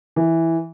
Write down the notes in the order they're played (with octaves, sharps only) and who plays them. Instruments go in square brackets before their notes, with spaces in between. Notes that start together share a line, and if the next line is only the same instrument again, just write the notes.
[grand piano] E3